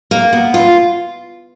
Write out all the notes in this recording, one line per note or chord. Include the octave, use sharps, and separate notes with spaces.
A#3
B3
F4